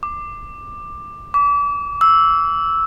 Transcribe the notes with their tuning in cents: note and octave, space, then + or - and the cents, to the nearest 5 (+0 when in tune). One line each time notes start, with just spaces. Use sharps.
D6 +15
D6 -40
E6 -5